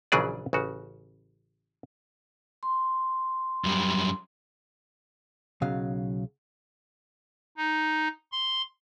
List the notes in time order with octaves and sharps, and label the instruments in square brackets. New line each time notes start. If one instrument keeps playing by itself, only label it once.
[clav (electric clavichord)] A#1 C#3 E3 F#3 G#4 D5
A1 C#3 F#4
[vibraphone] C6
[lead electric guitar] F#2 G3
[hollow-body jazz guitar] B1 C#3 F#3 F5
[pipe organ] D#4
C6